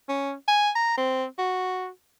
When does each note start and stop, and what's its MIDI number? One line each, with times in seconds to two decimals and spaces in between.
0.09 0.33 61
0.48 0.70 80
0.75 0.96 82
0.97 1.25 60
1.38 1.88 66